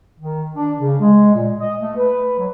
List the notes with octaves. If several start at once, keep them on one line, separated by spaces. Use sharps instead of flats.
D#3
D4
C#3
G#3
A#2
D#5
A3
B4
F#3